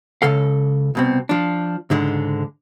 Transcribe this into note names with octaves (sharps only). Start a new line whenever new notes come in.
C#2 C#3 A4 F5
C2 B2 C4
F3 D4
C#2 G#2 D3 G#3